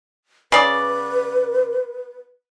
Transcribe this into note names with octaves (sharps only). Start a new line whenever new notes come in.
C#3 B4 D5